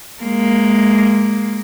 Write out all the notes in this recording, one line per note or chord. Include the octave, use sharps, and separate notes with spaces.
G#3 A#3